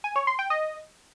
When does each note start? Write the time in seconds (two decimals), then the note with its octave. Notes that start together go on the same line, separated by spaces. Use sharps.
0.04 G#5
0.16 C#5
0.27 C6
0.39 G5
0.50 D#5